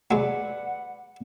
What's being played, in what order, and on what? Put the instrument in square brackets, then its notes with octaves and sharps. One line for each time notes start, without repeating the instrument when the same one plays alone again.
[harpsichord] F#3 G#3 [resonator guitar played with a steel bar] B4 D5 [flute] F#5